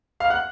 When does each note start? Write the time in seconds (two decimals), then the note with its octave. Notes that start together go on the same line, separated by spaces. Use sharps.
0.20 F5 F6
0.30 F#5 F#6